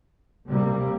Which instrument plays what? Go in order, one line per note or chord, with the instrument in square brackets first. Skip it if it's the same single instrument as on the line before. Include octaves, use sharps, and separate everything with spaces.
[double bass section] C3 G3 A#3